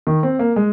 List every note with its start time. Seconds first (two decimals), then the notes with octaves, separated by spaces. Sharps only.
0.07 D#3
0.23 C4
0.39 A#3
0.56 G#3